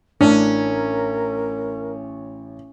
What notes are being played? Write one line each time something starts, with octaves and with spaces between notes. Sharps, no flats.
A1 C#4 D4 A#4